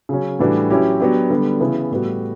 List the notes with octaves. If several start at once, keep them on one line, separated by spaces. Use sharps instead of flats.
C#3 F#3 C#4
A2 E3 G3 D4 F#4
F#3 C#4 E4 G4
F#3 B3 D4 G4
D3 G3 B3
C#3 E3 B3 E4
A2 G3 B3 F#4